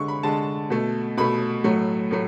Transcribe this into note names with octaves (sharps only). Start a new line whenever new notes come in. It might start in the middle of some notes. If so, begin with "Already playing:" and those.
Already playing: D3 G#3 C#6
B5
D3 G#3 A5
B2 A3
B2 A3 B5
A2 F#3 A3
A2 F#3 A3